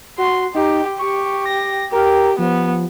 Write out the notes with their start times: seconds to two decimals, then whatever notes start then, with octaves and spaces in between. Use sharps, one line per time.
0.18 F#4 C6
0.55 D#4 G4
0.99 G4 C#6
1.46 A#6
1.92 G4 A#4
2.39 F3 B3